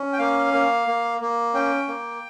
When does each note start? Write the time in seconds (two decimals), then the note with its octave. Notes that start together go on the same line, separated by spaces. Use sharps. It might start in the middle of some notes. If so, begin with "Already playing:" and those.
Already playing: C#4
0.13 G5
0.19 A#3 F5
0.53 A#3
0.87 A#3
1.21 A#3
1.54 C#4 G5
1.88 A#3